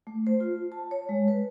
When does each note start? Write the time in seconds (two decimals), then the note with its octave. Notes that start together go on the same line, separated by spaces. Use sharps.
0.07 A3
0.27 C5
0.40 F4
0.72 A5
0.91 C#5
1.09 G#3
1.28 B4